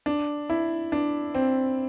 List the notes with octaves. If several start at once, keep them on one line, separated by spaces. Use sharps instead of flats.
D4
E4
D4
C4